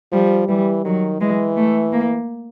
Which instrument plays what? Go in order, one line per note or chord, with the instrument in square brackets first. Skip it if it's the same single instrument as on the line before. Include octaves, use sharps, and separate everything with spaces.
[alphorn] F3 [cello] G3
[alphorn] E3 [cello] G3
[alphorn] D#3 [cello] F#3
[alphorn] E3 [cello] G#3
[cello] A3
A#3